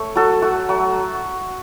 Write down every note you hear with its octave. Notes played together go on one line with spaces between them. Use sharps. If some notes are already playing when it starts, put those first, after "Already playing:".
Already playing: A3 C#5
F#3 F#4 A4
A3 F#4
F#3 F#4